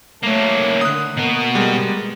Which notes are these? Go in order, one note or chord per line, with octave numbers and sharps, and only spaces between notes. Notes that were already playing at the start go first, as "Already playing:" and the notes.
A3 A#3 C#4
D3 D#6 F#6
B2 A#3 B3
G3 G#3